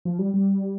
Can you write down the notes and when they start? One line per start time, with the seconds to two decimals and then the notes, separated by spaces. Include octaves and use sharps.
0.05 F3
0.19 G3
0.34 G3